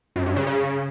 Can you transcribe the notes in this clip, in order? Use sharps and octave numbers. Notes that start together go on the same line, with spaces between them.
F#2
G2
C#3
C#3